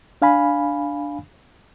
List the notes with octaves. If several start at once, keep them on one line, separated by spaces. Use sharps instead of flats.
D4 F5 G#5 B5